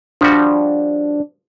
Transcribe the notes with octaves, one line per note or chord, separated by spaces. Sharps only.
F3 G3 D4 F#4